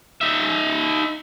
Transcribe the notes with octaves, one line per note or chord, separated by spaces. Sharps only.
D#4 E5